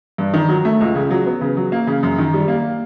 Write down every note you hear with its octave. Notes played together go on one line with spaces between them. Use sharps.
G2
D#3
F#3
A3
C#2
C#3
F#3
B3
C#3
F#3
A#3
C#3
F#2
D#3
G3
A#3